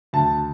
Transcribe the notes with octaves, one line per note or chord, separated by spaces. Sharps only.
D2 A5